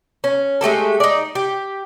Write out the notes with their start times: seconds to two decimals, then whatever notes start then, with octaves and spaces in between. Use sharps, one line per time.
0.24 C#4
0.61 G#3 A3 G4 A4
1.00 D#4 D5
1.35 G4